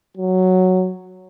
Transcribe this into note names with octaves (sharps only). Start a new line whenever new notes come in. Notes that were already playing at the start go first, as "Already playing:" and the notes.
F#3